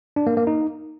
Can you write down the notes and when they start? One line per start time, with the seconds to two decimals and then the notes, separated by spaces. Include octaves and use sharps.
0.16 D4
0.27 A#3
0.37 A#3
0.47 D#4